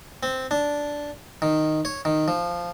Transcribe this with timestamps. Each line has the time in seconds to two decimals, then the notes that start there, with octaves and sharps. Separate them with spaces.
0.23 C4
0.51 D4
1.42 D#3
1.85 C#5
2.05 D#3
2.28 F3